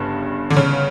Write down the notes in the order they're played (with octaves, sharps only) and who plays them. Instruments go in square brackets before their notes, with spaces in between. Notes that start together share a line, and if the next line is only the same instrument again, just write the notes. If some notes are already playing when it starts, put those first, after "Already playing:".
Already playing: [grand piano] G1 G2 [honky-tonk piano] C#3
[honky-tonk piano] D3
C#3